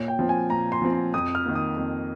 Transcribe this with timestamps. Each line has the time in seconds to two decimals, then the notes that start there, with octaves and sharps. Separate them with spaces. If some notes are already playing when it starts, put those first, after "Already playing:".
Already playing: A#2 C#5
0.08 G5
0.19 F3 C4
0.29 G#5
0.50 A#2 A#5
0.72 C6
0.82 F3 C4
0.93 C6
1.13 F2 D#6
1.35 F6
1.46 D#3 A#3
1.55 D#6
1.77 F2